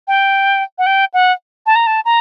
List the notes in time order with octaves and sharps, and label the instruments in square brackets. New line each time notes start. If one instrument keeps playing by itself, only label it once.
[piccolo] G5
F#5
G5
F#5
A5
A#5
A5
A#5